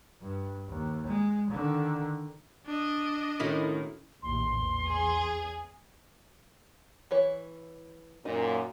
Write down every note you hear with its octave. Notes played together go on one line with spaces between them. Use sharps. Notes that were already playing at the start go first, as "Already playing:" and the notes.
G2
D#2
G#3
D3 D#3
D4 D#5
A2 D#3 C#4 E4 F#4 A4
A#1 D#2 A2 C6
E2
G#4
E3 E4 C#5
F#2 A#2 D#4